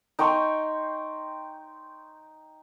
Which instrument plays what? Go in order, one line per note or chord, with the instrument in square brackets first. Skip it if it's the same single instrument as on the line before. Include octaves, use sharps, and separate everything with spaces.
[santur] D#4 G5 C6 C#6